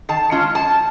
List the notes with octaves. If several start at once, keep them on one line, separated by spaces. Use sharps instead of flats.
D#3 A5
G#3 C#4 F4
F#2 A5